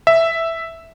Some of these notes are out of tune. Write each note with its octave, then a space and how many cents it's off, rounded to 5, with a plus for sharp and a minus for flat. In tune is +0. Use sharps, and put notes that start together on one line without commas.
E5 +0